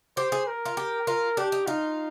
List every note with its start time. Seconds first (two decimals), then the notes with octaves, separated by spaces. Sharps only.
0.17 G4 C5
0.32 G#4
0.47 A#4
0.66 F4
0.77 G4
1.07 F4 A#4
1.37 D4 G4
1.52 D#4
1.67 D#4 F4